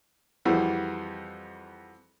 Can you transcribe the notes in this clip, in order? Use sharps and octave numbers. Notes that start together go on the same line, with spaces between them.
F2 E3 G3 E4 F#4 G#4